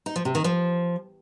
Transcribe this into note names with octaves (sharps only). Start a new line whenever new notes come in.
D#4
F3
C3
D#3
F3